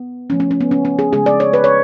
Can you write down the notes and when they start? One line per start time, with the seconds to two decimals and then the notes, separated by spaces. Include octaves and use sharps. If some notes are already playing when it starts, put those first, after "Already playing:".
Already playing: B3
0.30 C#3 F3 A3 C#4
0.40 C#4
0.51 C#4
0.61 B3
0.71 C#4
0.85 C#4
0.99 G#4
1.12 C#3 G#3 G#4
1.26 D5
1.40 C#5
1.53 B4
1.64 C#5